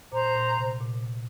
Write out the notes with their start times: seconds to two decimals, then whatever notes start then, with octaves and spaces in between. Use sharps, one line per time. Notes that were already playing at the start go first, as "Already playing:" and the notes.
0.11 A#2 C5 A#5
0.35 A#2
0.57 C3
0.80 A#2